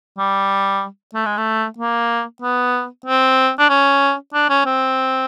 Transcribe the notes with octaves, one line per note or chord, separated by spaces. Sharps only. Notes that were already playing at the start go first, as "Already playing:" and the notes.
G3
A3
G#3
A3
A#3
B3
C4
D4
C#4
D4
C#4
C4